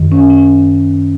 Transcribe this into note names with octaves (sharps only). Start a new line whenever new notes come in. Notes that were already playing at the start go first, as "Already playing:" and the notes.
Already playing: F#2 D#3
C#4
C#4